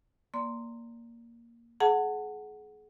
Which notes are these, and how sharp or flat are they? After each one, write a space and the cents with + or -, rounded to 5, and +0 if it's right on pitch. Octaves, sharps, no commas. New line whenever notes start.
A#3 +0 D5 -15 C6 +0
G#4 +35 F#5 +0 A5 +35